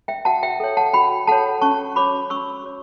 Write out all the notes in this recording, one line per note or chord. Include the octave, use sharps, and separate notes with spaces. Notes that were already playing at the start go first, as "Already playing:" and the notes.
E5 G5
F#4 F#5 A5
E5 G5
A4 C#5
F#5 A5
F#4 G5 B5
A4 C#5 F#5 A5
C#4 A5 C#6
F#4 C#5 B5 D6
C#4 C#6 E6
F#4 C#5